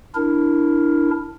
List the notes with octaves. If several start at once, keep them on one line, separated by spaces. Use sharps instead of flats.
D4 E4 A#4